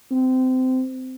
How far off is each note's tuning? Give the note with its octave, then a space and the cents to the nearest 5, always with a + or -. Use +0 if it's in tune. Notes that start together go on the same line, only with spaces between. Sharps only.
C4 -25